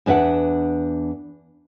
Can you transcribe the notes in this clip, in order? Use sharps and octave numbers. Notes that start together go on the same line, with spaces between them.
E2 D4 B4 E5 F#5